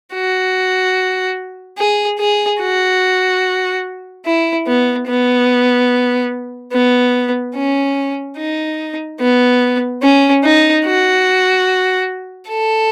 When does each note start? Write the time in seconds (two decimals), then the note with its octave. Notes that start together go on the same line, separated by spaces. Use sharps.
0.13 F#4
1.78 G#4
2.19 G#4
2.61 F#4
4.25 E4
4.67 B3
5.08 B3
6.72 B3
7.55 C#4
8.37 D#4
9.20 B3
10.02 C#4
10.44 D#4
10.85 F#4
12.50 A4